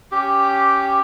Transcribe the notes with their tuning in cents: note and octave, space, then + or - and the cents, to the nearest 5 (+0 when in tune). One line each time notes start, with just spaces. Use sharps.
C#4 +0 G4 +0